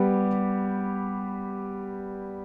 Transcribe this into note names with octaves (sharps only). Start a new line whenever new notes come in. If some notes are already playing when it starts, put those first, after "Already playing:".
Already playing: G3 B3 G4